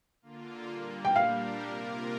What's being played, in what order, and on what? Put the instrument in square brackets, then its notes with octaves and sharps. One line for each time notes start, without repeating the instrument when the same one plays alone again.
[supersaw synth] D3 A#3 F4
A#2 G3 A#3
[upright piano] G5
[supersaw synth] G3 D4 G4 A#4 [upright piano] F5
[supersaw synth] C3 A#3 F4 A#4